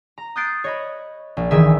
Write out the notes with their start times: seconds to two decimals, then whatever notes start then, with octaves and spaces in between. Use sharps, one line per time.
0.18 A#5
0.36 D#6 F#6 G6 A6 C7 D7
0.64 C#5 D#5 B5
1.37 A#1
1.51 G1 D#3 E3 G#4 E5 E6